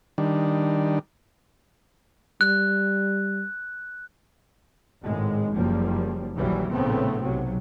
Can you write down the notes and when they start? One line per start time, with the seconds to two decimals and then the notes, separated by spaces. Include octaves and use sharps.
0.18 D#3 G3 D4
2.41 G3 F#6
5.03 G#1 A2 G#3
5.54 F#1 F3 G3 A#3
6.36 A#1 D#2 E3 F#3 G3
6.72 A#1 A2 C#3 A3 B3 C4
7.23 B1 C3 F#3